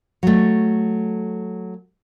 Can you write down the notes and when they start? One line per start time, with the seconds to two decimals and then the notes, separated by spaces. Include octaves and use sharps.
0.23 F#3 A3